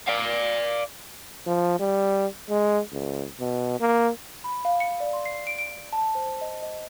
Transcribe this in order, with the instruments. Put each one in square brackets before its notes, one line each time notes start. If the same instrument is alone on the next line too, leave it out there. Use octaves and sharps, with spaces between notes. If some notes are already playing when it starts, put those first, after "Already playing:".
[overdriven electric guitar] D5 F5
[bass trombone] F3
G3
G#3
C#2
B2
A#3
[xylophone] B5
F5
C#7
D5
C6
C7
D7
D7
A5
C5
D#5
D#5